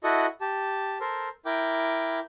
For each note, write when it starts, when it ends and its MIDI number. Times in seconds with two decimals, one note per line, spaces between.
0.04 0.26 64
0.04 0.26 66
0.04 0.26 69
0.04 0.26 75
0.04 0.26 78
0.41 0.98 67
0.41 0.98 81
1.00 1.29 69
1.00 1.29 70
1.00 1.29 72
1.46 2.20 64
1.46 2.20 70
1.46 2.20 79
1.46 2.20 86